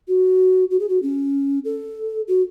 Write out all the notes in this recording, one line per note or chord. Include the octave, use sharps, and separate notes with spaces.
F#4
F#4
G#4
F#4
C#4
A4
F#4